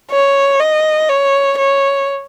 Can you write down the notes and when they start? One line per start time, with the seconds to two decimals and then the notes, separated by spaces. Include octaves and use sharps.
0.11 C#5
0.59 D#5
1.09 C#5
1.58 C#5